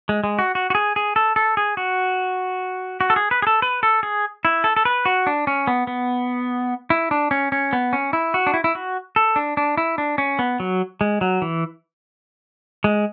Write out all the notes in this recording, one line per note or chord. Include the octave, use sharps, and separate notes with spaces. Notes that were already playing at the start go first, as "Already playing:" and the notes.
G#3
G#3
F#4
F#4
F#4
G#4
G#4
A4
A4
G#4
F#4
F#4
A4
G#4
B4
G#4
A4
B4
A4
G#4
E4
A4
A4
B4
F#4
D4
C#4
B3
B3
E4
D4
C#4
C#4
B3
C#4
E4
F#4
D4
E4
E4
F#4
A4
D4
D4
E4
D4
C#4
B3
F#3
G#3
F#3
E3
G#3